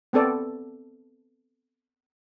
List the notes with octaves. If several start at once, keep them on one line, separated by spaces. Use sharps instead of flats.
B3 C4 A4 D5